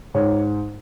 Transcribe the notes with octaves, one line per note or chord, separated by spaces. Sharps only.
G#2 C#5